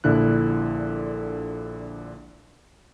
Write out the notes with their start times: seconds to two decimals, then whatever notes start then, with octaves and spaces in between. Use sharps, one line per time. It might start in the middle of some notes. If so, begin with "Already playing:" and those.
0.04 A#1 A#2 D3 E4 F#6